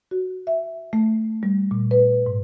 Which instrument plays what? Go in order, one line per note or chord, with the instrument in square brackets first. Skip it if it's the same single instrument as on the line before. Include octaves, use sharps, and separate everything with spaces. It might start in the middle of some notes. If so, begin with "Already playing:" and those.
[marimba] F#4
E5
A3
G3
A#2
B4
G#2